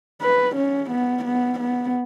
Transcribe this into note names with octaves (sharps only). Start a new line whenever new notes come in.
B4
C#4
B3
B3
B3